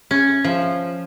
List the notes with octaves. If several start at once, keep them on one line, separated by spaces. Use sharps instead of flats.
C#4
F3